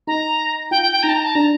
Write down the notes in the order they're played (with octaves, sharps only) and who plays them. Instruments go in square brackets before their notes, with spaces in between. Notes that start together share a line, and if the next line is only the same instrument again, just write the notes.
[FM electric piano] D#4 [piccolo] A#5
[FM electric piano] F4 [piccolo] G5
[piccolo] G5
G5
[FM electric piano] D#4 [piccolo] A#5
[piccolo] A5
A#5
A5
[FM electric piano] D4 [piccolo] A#5